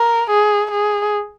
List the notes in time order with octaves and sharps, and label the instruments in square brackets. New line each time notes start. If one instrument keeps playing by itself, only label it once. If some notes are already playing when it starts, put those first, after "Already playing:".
Already playing: [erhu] A#4
G#4
G#4